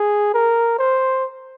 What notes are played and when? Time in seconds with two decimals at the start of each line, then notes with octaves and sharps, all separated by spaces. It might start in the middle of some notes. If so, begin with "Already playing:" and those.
Already playing: G#4
0.34 A#4
0.78 C5